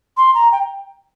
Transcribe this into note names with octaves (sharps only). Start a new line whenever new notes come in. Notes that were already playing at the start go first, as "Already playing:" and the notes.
C6
A#5
G5